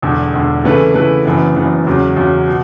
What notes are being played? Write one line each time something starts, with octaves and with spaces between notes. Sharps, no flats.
E1 E2 D3
E1 E2 D3
C#3 E3 A3 E4 B4
C#3 E3 A3 E4 B4
F#1 F#2 E3 B3
F#1 F#2 E3 B3
E2 C#3 F#3 C#4
E2 C#3 F#3 C#4
B2